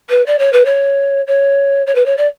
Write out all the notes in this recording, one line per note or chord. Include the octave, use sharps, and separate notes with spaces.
B4
D5
C#5
B4
C#5
C#5
C#5
B4
C#5
D5